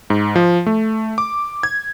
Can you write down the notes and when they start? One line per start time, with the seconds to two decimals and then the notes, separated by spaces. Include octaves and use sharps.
0.10 G#2
0.36 F3
0.66 A3
1.18 D6
1.63 G#6